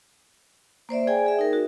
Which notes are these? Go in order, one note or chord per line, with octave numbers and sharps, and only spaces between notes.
A#3 C5 D5 E5
G#4 D5 G5 G#5
G#4 E5
D#4 A#4
F#4